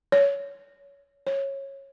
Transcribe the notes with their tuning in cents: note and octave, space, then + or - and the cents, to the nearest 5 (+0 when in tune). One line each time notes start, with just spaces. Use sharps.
C#5 +20
C#5 -15